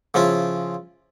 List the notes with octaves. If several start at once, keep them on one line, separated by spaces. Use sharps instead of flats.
C#3 F3 E4 F4